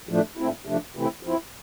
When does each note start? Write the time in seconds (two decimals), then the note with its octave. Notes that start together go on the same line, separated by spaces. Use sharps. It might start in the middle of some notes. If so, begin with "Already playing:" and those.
0.09 A2 F3 A3 D4
0.37 A#2 A3 C4 E4
0.65 C3 F3 A3 D4
0.95 C3 E3 A3 C4 E4
1.23 F3 C4 E4